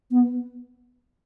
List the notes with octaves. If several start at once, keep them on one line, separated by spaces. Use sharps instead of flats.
B3